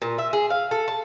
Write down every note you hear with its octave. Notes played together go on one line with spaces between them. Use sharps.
A#2
E5
G#4
F5
A4
A5